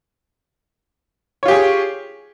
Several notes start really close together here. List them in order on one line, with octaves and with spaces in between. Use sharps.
C#5 F4 G4 G#4